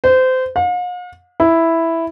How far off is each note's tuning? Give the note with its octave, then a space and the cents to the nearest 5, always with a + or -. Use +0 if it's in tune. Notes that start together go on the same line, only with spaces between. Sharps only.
C5 -25
F5 +45
E4 +0